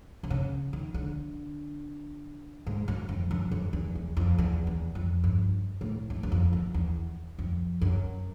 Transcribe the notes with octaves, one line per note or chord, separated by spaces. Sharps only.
C3
C#3
D#3
D3
G#2
F#2
F2
F#2
F#2
E2
E2
F2
E2
E2
F2
G2
A2
F2
E2
F2
E2
E2
F2
F#2